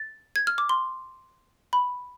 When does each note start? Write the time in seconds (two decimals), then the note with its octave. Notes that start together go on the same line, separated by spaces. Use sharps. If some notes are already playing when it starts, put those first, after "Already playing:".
Already playing: A6
0.36 G#6
0.47 F6
0.58 D6
0.69 C6
1.73 B5